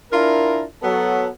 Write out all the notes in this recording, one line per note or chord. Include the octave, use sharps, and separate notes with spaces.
D4 E4 F4 A#4
F#3 B3 A4